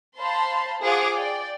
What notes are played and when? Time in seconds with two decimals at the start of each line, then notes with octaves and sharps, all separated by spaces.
0.17 C5 F5 A5 B5 C6
0.82 F4 G#4 C5 F5 F#5 D6
1.15 D5 G5